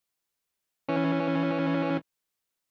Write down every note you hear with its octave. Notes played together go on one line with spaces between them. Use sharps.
E3 C#4